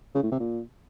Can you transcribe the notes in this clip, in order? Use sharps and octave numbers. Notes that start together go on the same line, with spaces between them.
C#3
A2
C3
A#2